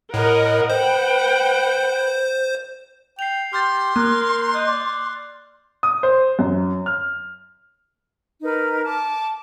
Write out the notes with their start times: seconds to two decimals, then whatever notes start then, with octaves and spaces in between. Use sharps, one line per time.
0.14 A2 A#4 D#5 F#5
0.70 B4 C5 F#5 G5
3.19 G5 C7 F7
3.53 G4 C6 F6 G6 A6
3.96 A#3 A#4 F#6
4.54 D#5 F#6 G6
4.67 D5
5.83 D#6
6.03 C5
6.39 F#2
6.86 F6
8.41 D#4 A#4 B4
8.84 A5 D6